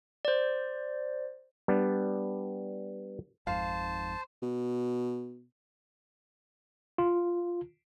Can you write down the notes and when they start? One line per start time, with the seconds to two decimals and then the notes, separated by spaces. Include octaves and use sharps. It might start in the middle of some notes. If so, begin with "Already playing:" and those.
0.25 C5 D5
1.68 G3 B3 D4
3.47 G#1 F2 G#2 C5 F5 A5
4.43 B2
6.98 F4